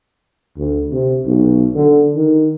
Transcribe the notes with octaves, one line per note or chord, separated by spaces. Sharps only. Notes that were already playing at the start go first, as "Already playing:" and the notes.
D2
C3
B1
D3
D#3